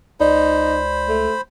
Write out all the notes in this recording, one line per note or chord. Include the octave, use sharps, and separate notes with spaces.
C#2 D#4 C5 D5 B5
A3